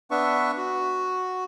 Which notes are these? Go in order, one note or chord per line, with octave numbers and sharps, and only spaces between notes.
B3 D4 B4 E5 C#6
F#4